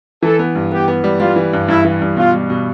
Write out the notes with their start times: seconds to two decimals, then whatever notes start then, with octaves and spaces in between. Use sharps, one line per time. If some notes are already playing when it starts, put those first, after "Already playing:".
0.23 E3 A4
0.39 B3
0.55 G2
0.72 B3 G4
0.88 B3
1.04 G3
1.20 G3 F4
1.36 E3
1.53 G2
1.68 G2 E4
1.85 E3
2.01 G2
2.17 B2 F4
2.33 G3
2.50 B2